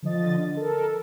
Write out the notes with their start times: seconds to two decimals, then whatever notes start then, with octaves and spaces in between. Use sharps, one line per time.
0.03 D3 F3 D#5 A6
0.57 A4 A#4